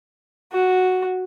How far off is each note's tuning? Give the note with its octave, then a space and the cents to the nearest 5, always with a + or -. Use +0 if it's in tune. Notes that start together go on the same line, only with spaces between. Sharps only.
F#4 -5